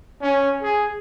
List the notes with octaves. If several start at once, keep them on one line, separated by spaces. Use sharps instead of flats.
C#4
G#4